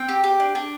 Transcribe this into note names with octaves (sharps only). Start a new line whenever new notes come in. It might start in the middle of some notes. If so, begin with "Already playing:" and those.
Already playing: C4 G5
G4
G4
D4
D4